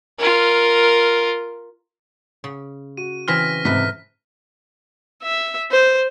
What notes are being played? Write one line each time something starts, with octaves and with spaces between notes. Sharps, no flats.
F4 A#4
C#3
F#4 D#7
C#3 E3 C4 F6 A#6 B6
G#2 C3 A4 B4 B6
E5
C5